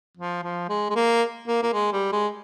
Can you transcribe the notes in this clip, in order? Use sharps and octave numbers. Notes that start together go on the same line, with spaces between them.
F3
F3
G#3
G#3
A#3
A#3
A#3
G#3
G3
G#3